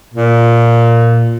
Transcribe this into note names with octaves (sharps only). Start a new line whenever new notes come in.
A#2